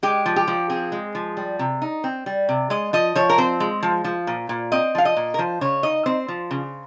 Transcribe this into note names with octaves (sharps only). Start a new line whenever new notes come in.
G#3 G4
F3
G4
F3
C4 G#4
G#3
F3
G3
C3
D#4
C4
G3
C3
G#3 D#5
F3 D#5
F3 C#5
A#4
C4 C5
G#3
F3
F3
A#2
A#2
C4 D#5
F3 F5
D#5
A#2
A#4
F3 C5
C#3 C#5
D#4 D#5
C4 C5
F3
C#3